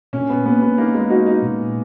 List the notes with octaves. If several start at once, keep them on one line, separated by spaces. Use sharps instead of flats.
A#2 C#4
B3
A#3 B3
B3
A#3 D#4
G#3
D#4 F#4
D#4
A#2